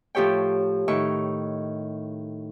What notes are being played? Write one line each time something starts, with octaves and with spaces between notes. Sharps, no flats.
A2 F3 G4 C#5 G5
A2 D#3 C#6